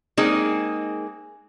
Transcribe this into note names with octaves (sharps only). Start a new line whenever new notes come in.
G#3 A#3 C4 D#4 G#4